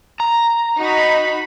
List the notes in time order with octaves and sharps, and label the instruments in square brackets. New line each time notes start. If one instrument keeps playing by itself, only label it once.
[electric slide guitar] A#5
[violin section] D#4 F#4 B5